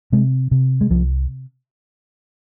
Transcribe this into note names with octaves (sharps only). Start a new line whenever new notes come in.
C3 G#3
C3
G#3
C2 F3